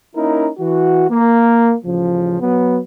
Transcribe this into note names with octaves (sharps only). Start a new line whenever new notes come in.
A#3 C#4 D#4 E4 A#4
E3 F#4
A#3
A1 C#3 F3
F#3 B3